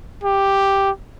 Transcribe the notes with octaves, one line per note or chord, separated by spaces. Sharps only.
G4